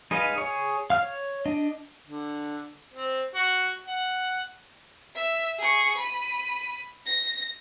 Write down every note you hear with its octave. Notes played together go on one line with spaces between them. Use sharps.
D#4 G#4 B4 D#5 F5
G#4 C#5
F5 F6
C#5
D4 D#5
D3
C4
F#4
F#5
E5
G#4 C#6
B5 D#7
A#6